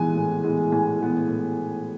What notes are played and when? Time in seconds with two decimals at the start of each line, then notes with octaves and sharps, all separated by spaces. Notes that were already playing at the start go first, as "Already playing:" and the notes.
Already playing: E3 G#3 B3 G#5
0.16 A2
0.44 E3 G#3 B3
0.72 A2 G#5
1.00 E3 G#3 B3
1.28 A2